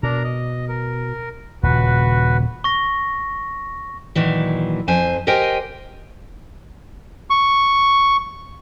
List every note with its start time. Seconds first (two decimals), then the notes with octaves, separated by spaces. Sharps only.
0.03 B2 D4 A#4 A#5
0.24 D#5
0.68 A#4
1.63 D#1 A#2 C#3 F#4 B4
2.64 C#6 A#6
4.15 A#2 D#3 E3 F#3
4.88 F2 C5 G#5
5.27 G4 A#4 C5 D#5 G5 G#5
7.30 C#6